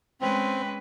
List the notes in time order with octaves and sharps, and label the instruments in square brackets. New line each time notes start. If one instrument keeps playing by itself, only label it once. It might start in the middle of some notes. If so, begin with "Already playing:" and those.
[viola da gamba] G#3 C#4 B4 [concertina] C4